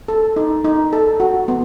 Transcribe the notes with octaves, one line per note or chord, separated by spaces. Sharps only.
A4
D#4
D#4
A4
F#4
B3